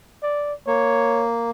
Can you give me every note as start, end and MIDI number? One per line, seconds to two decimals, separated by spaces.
0.23 0.53 74
0.67 1.51 58
0.67 1.25 73